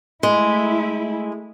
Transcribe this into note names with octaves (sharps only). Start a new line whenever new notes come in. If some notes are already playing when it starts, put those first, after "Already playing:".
G#3 A3 E4